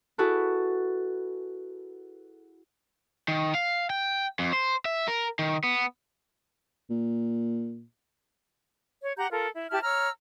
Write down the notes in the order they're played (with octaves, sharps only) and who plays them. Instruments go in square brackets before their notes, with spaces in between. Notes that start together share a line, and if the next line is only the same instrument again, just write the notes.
[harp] E4 F#4 G#4 A4 B4
[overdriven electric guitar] D#3
F5
G5
F2
C5
E5
A#4
D#3
B3
[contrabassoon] A#2
[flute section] C#5
G4 F#5 A#5 G6
F4 A4 A#4
E4
E4 G4 A5 F6
C#5 A#5 E6 F6